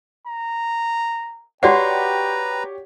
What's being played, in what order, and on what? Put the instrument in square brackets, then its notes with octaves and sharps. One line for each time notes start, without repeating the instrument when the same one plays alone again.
[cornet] A#5
[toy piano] F#4 D5 F#5 [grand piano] G4 C#5 [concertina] B4 A#5 [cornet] G5